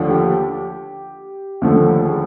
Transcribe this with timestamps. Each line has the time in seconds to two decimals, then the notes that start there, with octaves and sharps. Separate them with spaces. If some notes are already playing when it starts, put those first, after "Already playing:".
Already playing: D#2 D3 F3 A3 D4
0.10 G4
1.62 D#2 D3 F3 A3
2.05 G#4